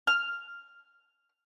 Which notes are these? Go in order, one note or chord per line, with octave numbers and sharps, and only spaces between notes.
F6